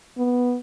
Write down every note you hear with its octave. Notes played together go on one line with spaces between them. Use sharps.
B3